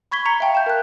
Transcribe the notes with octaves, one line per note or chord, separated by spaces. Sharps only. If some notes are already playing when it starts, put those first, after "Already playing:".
B5 C#6 G#6 B6 G7
A#5 C#6 C#7
E5 F5 G5 A5 A#5
G6 E7
A#4 F#6